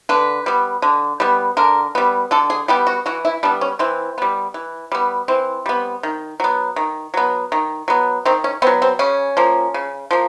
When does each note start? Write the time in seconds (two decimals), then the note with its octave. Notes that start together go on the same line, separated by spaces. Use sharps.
0.09 D3 B4
0.46 G3 B3
0.82 D3
1.20 G3 B3
1.57 D3 A#4
1.95 G3 B3
2.31 D3 A4
2.50 G#4
2.68 G3 B3 G4
2.87 F#4
3.06 E3 F#4
3.25 E4
3.43 G3 B3 D4
3.61 C#4
3.79 E3 C4
4.18 G3 B3
4.54 E3
4.92 G3 B3
5.28 E3 C4
5.66 G3 B3
6.03 D#3
6.40 F#3 B3
6.76 D#3
7.14 F#3 B3
7.52 D#3
7.88 F#3 B3
8.25 D#3 C4
8.44 C#4
8.62 B3 C4
8.67 F#3
8.82 C4
8.99 C#3 C#4
9.37 F3 A#3
9.74 C#3
10.11 F3 A#3